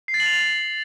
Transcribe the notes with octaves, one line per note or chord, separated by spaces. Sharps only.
C7
A6
F#7
F7